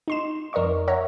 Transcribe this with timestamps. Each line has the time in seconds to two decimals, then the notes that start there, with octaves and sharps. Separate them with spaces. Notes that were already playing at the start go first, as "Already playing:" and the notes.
0.08 D#4 C6 E7
0.53 F2 A#4 D5 D#5 C#6
0.88 C#5 E5 F#5 A#5